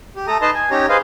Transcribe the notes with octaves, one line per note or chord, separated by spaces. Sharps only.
G4
A3 A4 A#5 D#6
D#4 B4 D#5 A5 A#5 C6
G#5
C#4 D#4 G4 C#5 A#5
G#4 B4 C5 D#5 F5